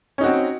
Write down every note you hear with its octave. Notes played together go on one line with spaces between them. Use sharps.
C4 C#4 D#4 F#4